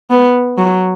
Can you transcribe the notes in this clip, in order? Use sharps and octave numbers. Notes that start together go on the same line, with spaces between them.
B3
F#3